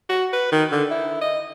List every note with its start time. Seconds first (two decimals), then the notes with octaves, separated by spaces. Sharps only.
0.09 F#4
0.33 B4
0.52 D#3
0.72 D3
0.91 E4
1.21 D#5